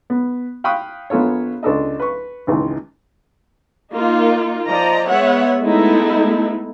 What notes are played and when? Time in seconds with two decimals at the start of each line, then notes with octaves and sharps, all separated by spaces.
0.10 B3
0.64 F5 G5 B5 C#6 D#6 F#6
1.10 A#1 B3 F4 A4 C#5
1.63 C#2 D4 A4 D#5
2.00 B4 C#6
2.47 G#1 C#2 E3
3.92 A#3 D#4 F4
4.68 F3 D5 D#5 A#5
5.09 G#3 B3 C#5 E5 F#5
5.62 G#3 A3 B3 D#4 E4 A4